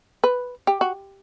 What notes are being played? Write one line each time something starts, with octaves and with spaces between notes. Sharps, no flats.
B4
G4
F#4